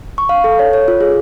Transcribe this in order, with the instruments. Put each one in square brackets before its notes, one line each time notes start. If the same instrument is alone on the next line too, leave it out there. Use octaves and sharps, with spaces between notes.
[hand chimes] C#6
F5
A4
C#5
C#5
F4
G#4